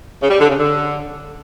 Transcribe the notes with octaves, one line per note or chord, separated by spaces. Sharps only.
C#3
G3
D3
C#3
D3